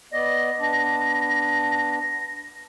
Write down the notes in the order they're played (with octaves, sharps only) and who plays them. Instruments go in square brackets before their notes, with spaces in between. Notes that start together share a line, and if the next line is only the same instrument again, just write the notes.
[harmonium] B3 D5 D#5 [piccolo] A#6
[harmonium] B3 D4